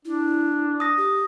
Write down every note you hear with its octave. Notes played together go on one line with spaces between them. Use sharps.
D4 E4
D#6 A#6
G4